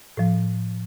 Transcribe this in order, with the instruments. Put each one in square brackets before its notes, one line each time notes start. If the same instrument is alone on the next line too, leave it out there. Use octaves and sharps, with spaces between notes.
[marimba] A2 F3